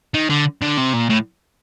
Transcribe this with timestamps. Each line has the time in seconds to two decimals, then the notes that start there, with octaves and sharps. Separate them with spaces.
0.14 D#3
0.30 D3
0.62 D3
0.78 C3
0.93 A#2
1.09 A2